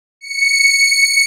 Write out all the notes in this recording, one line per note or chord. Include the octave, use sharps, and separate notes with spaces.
C#7